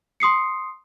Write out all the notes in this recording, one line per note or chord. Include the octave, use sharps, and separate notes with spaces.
C6 D#6 C7 C#7